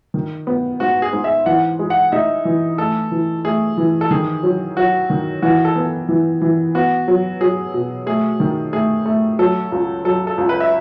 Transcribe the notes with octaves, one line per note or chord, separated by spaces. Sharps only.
D#3
B3
G#2 F#4
G#4
G#2
E5
E3 F#5
G#3
F#5
D#4 E5
E3
A3 A4
E3
A3 G#4
E3
A4
D#3 G#4
F#3
F#3 F#4
D#3
E3 F#4
A4
B3
E3
E3
B3 F#4
F#3
F#3 G#4
B2
A3 G#4
D#3
A3 G#4
A3
F#3 A4
C#2
F#3 A4
A4
C#2
B4
E5